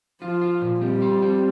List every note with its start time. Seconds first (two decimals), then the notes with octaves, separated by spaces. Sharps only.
0.22 F3 F4
0.41 F4
0.61 A#2
0.81 G3 C4
1.02 F4
1.22 C4